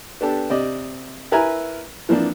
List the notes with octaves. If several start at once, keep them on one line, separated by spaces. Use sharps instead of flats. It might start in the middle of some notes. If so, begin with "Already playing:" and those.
B3 D4 G4 A4
C3 C4 D5 D#5
E4 A#4 B4 E5 G#5 A#5
E3 F3 A#3 C4 D4